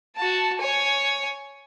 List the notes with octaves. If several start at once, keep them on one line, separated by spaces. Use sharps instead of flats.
F#4 A5
C#5 G#5